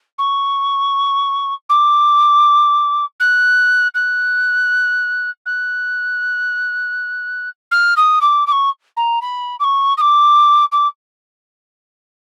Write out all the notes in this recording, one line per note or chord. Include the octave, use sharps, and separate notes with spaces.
C#6
D6
F#6
F#6
F#6
F6
D#6
D6
D6
C#6
A#5
B5
D6
C#6
D#6
D6
D6